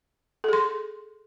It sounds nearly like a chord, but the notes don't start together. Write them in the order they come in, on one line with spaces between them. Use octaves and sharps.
A4 G#4 C6